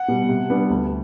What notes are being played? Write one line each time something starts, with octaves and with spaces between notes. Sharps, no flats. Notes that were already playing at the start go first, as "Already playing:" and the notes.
Already playing: F#5
B2 G3
C3
G3 B3 D4
D2